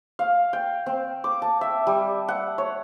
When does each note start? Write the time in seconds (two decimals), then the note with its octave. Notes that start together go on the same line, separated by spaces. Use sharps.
0.19 F5
0.53 G5
0.86 C4
1.24 D6
1.42 A5
1.61 E5
1.87 G3
2.28 F#5
2.58 C#5